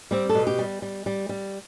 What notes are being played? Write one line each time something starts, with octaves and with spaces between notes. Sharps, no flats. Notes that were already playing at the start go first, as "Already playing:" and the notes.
G3 C4
A4
B2
G4
G3
G3
G3
G3